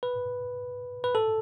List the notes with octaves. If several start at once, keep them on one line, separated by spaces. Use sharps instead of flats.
B4
B4
A4